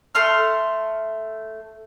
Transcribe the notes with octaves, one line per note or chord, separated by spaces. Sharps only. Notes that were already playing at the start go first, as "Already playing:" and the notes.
A3 C6 F6